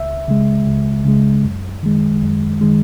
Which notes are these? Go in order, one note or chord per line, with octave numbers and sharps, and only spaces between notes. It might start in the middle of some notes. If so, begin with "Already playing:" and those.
Already playing: C#2 E5
C#3 G#3
C#2
C#3 G#3
F#2
D#3 G#3
F#2
D#3 G#3